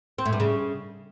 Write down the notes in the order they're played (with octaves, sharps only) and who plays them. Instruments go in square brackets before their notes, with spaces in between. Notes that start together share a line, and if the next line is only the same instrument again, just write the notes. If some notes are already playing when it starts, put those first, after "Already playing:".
[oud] C4
A2
G2
C#3